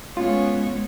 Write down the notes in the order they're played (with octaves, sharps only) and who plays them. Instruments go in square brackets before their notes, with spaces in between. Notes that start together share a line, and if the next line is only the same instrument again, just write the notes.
[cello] G#3 [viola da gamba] B3 C#5 [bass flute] C#4 [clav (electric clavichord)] F4